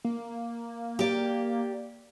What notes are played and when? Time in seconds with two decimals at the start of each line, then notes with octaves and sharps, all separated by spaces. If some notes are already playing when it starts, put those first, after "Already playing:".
0.05 A#3
0.99 G4 D5